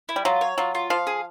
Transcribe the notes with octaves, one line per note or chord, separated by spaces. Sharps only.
E4
G3
F#3 F4
C#5
F#3 F4
F4
F3 F5
G#4